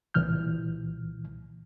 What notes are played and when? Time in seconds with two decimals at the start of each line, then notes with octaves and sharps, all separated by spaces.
0.14 C2 A#2 E3 F6 G6